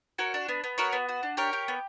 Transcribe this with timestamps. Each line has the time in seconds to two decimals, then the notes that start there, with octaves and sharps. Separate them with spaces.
0.18 F#4 A#4 C#5
0.34 D4
0.49 B3
0.64 B3
0.78 F#4 A#4 C#5
0.93 B3
1.09 F#4
1.23 D4
1.37 G4 A#4 C#5
1.53 G4
1.68 B3